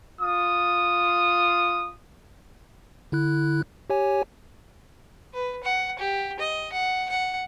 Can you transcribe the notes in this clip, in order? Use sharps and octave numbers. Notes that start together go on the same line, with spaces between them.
F4 D#6
D3 E4 F#6
G4 C#5 G#5
B4
F#5
G4
D#5
F#5
F#5